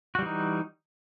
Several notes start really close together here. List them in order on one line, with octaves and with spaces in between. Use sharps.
F#4 G3 E3 D#4